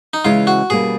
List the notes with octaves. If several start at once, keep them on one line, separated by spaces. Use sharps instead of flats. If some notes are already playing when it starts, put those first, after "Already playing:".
D#4
C#3 E3 G#3 C#4 E4 F4
F#4
B2 G3 A#3 C#4 G#4